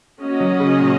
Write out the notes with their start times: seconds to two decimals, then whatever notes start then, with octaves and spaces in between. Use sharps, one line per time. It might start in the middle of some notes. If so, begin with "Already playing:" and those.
0.21 A#3 C#4 F#4 D#5
0.40 F#3
0.60 C#3
0.80 A#2